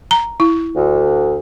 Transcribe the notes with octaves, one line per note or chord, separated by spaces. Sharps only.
A#5
E4
D2